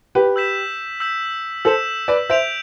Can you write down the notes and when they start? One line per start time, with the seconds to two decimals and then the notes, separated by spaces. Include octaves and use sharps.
0.15 G4 B4
0.36 E6 G6 B6 E7
1.00 E6 G6 B6 E7
1.65 A4 C5 E6 G6 B6 E7
2.08 B4 D5
2.29 C5 E5 G6 D7 F7